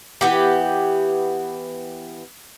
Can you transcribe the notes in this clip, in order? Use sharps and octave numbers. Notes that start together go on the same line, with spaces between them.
E3 B3 G4